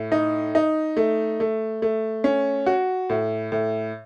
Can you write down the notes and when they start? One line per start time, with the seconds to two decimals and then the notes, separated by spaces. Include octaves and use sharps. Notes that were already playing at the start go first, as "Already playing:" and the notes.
Already playing: A2
0.12 D#4
0.55 D#4
0.97 A3
1.40 A3
1.82 A3
2.24 C#4
2.66 F#4
3.10 A2
3.52 A2